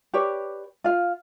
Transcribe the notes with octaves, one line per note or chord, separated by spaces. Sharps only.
G4 B4 C#5 D5
F4 F5